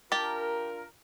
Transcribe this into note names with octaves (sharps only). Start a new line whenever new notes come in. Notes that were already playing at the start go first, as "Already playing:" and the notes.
D4 F4 G4 A#4 A5